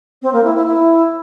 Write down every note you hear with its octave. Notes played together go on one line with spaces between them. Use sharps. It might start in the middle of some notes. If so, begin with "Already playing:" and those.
C4
A#3
E4
E4
E4